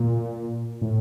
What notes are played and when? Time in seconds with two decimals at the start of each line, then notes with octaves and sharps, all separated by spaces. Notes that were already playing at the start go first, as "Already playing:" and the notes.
Already playing: A#2
0.82 A2